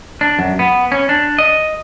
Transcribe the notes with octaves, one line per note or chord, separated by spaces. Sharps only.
D4
F#2
B3
C#4
D4
D#5